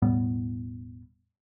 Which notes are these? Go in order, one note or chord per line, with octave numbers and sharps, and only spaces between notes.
E1 A2 G3 B3